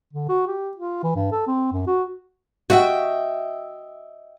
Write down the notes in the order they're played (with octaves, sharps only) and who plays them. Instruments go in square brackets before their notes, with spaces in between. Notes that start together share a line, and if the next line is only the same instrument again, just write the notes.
[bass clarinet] D3
F#4
G4
F4
E3
G2
A4
C4
F#2
F#4
[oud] F#4 [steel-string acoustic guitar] D#5 E5 G5